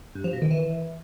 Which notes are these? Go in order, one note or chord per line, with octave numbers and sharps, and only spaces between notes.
G2
F3
B2
D#3
E3